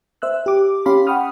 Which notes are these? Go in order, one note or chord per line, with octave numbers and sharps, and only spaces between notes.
C5 E5 E6 F#6
G4 D6
C#4 G4 F5 B5 C6
F#5 G5 B5 C#6 D#6 F6